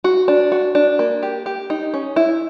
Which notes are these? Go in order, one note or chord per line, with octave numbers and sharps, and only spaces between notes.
F#4
D4
F#4
D4
A#3
G4
G4
D#4
C#4
E4